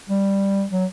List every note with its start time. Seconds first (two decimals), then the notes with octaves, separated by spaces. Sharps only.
0.09 G3
0.71 F#3